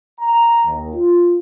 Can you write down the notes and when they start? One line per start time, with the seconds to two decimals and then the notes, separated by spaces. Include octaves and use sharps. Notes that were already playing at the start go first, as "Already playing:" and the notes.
0.21 A#5
0.65 D#2
0.95 F4